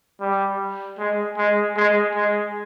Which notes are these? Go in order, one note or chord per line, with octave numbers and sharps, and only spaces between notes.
G3
G#3
G#3
G#3
G#3